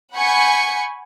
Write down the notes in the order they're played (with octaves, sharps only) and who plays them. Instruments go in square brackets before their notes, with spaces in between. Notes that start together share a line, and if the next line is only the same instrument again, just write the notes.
[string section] F#5 G#5 B5 C#6 G6 C#7